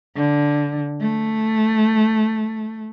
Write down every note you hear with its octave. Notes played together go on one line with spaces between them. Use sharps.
D3
A3